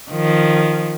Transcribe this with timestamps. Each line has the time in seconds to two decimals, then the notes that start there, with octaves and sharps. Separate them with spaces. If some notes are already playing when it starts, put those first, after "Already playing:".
0.11 D#3 F3